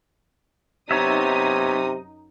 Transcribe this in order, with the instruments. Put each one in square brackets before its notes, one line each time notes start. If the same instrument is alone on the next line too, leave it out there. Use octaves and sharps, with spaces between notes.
[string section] F#2 D#4 D#6 [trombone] C3 [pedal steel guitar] B3 C#5 E5